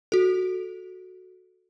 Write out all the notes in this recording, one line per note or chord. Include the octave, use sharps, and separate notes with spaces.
F#4 A4